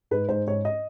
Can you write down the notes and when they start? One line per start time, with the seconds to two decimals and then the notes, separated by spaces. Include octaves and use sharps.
0.11 G#2 B4
0.29 G#2 C5
0.47 G#2 C#5
0.65 D#5